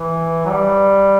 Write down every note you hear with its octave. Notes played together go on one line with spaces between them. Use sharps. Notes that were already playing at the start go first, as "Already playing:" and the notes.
Already playing: E3
F#3
G3